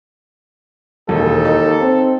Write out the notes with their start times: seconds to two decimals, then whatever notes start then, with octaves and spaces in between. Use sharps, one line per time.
1.09 E1 D#2 A4
1.45 D#4
1.80 C4